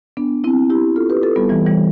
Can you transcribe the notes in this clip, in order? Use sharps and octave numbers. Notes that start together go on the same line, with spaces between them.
B3 D4
C4 E4
E4 G4
F4 A4
G4 B4
F4 A4
G3 B3
E3 G3
E3 G3